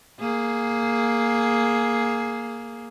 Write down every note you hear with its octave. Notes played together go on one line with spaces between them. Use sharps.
A#3 G#4